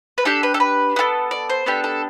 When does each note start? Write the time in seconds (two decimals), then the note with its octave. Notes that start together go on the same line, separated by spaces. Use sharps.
0.18 B4
0.25 D4 G4 A4
0.43 B4
0.54 A4
0.60 B4
0.96 B3 F#4 A4
1.31 D5
1.49 C5
1.66 B3 D4 G4 A4
1.84 A4